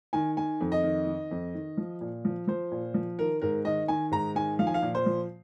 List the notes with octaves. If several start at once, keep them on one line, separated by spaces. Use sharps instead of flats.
D#3 G#5
D#3 G#5
F2
D#5
D#3
D#3
F2
D#3
F3
A#2
F3
F3 C5
A#2
F3
D#3 A#4
G#2 A#4
D#3 D#5
D#3 G#5
G#2 A#5
D#3 G#5
F3 F5
G#5
F5
A#2
C5
F3